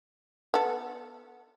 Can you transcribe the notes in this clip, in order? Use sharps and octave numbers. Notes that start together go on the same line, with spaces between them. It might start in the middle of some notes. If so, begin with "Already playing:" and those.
B3 A4